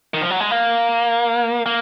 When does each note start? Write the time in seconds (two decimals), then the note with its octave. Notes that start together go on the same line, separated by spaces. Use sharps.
0.14 D#3
0.21 F3
0.30 F#3
0.40 G#3
0.51 A#3
1.66 A#3